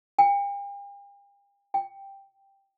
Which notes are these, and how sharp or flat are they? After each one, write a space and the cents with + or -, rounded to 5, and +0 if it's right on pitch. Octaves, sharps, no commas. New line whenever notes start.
G5 +45
G5 +5